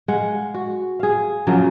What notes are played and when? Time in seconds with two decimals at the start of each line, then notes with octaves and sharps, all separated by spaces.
0.08 G#3 F5 F#5
0.54 F#4
0.99 G#4 F5
1.47 C#3 F3 F#3 A#3